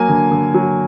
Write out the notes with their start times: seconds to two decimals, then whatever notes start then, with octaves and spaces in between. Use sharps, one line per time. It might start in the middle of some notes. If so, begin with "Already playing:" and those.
Already playing: F#3 A#3 G#5
0.09 D3
0.31 D3
0.54 F#3